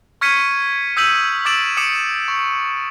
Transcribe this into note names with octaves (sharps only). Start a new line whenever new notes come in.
C#6 F6 G#6 B6 C#7 D#7
D#6 E6 G6 B6 D#7 F#7
D6 E6 A6 D7 E7 F#7
D6 D#6 C#7 D7 E7 F#7
C#6